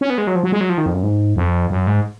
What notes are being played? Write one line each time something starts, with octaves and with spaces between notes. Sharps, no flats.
C#4
B3
G#3
F#3
F3
F#3
G#3
F#3
F3
D#3
F2
F#2
G#2
F2
F#2
G#2